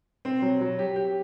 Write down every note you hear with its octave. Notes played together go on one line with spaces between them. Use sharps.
C4
F#3
F#3
G4
G4